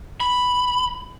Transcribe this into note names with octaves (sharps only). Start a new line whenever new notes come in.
B5